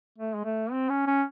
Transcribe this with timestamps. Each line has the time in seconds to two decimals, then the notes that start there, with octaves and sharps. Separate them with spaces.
0.19 A3
0.35 G#3
0.45 A3
0.72 C4
0.89 C#4
1.07 C#4